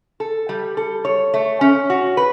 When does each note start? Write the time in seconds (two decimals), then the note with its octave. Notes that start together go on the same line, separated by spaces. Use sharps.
0.20 A4
0.49 G3
0.77 A4
1.05 C#5
1.34 A3
1.61 C#4
1.90 F#4
2.17 B4